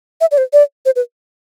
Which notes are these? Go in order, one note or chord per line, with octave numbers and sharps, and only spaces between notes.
E5
D5
C5
D5
C5
B4